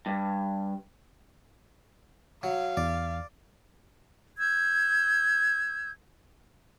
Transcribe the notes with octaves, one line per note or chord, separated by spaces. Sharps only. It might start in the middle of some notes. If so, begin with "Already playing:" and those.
G2
F#3 F5
E2 D5
E6 G6 G#6